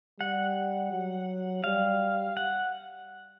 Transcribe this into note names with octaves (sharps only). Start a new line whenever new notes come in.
G3 F#5
F#3
G3 F5
F#5